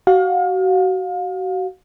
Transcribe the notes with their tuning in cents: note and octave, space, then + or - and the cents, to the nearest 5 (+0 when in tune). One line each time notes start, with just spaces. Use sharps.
F#4 +30 F5 +30